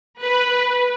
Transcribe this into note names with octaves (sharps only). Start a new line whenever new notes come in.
B4